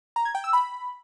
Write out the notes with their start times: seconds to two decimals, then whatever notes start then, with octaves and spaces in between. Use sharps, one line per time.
0.16 A#5
0.25 G#6
0.35 G5
0.44 E6
0.53 B5